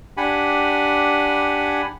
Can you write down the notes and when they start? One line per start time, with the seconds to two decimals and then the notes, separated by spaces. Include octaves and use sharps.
0.17 D4 G4 F#5 G#5 B5